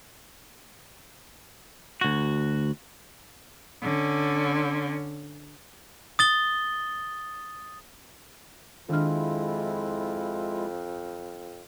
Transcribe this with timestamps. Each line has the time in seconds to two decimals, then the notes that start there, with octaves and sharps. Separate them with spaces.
2.01 D2 F#4
3.82 D3 C#4
6.19 D#6 A6 G7
8.89 F2 D#3 G#3 D4 E4 F4 F6